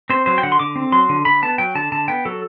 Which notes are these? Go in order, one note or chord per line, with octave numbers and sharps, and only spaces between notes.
C4 C5
F#3 C5
G5
D3 F#5
C6
D3 D6
C4
F#3 C6
D3
D3 B5
B3 A5
F#3 G5
D3 A5
D3 A5
B3 G5
F#3 A4